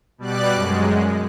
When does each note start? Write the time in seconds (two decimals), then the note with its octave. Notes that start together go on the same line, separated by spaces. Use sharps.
0.18 B2 G3 D5 F#6
0.53 F#2 G#3